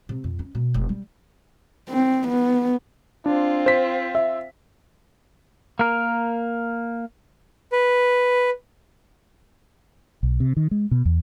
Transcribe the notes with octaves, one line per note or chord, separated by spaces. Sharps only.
C3
F2
C#4
B2
F1
G3
C4
B3
C4 D4 F4
C5 B6
E5
A#3 A#4
B4
B1
C3
D#3
G#3
B2
E2